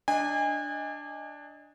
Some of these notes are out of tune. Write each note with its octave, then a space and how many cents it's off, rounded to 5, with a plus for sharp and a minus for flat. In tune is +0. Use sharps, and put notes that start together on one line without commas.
D4 +0 D#5 +10 G#5 -30